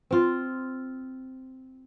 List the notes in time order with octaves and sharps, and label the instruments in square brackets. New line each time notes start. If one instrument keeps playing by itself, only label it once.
[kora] C4 F4